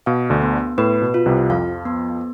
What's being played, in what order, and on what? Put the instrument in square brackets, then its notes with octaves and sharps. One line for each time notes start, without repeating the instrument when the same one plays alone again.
[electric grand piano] B2 [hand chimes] F5
[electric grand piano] D2 D3
[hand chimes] B3
[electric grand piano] A2 [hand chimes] B4
[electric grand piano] B2
[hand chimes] F4
[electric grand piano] C2 C3
[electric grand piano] F2 F3 [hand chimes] F5
[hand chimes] B3